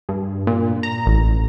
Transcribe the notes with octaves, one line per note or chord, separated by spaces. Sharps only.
G2
A#2
A#5
A1